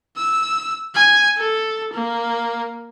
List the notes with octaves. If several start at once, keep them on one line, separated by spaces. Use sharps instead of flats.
E6
G#5
A4
A#3